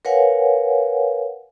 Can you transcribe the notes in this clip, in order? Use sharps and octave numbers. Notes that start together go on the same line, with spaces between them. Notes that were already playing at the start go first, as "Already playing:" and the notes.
A#4 B4 C#5 F5 F#5 G#5